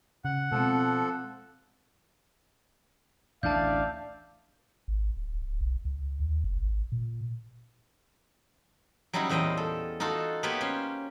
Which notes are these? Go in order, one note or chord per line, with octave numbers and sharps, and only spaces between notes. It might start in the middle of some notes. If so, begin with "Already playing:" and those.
C#3 F#5
B2 F3 G#3 C4 A4
A1 D2 D4 D5 E5 F5 A5 G6
G#1
D#1
D1
B1
C#2
D#2
F#1
G#1
A#2
F#3 G3 C#4 D#4 E4 F#4
E2 A#2 C5 D#5 F5 G5
A4
D#4 F4 F#4 A4
A#3 B3 F4 G4 B4 C#5
C#4 C5